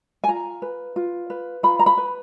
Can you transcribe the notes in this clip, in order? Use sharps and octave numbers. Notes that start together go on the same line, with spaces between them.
G#5
F4 A#5
B4
F4
B4
F4 B5
A#5
B5
B4